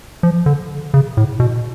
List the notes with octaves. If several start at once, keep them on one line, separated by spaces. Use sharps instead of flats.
F3
D3
C#3
A2
B2